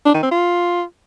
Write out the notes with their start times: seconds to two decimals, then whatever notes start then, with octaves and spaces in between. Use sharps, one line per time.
0.06 D4
0.14 D#3
0.23 C4
0.31 F4